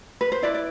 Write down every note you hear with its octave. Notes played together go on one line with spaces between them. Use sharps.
B4
C5
E4 B4 D5
D5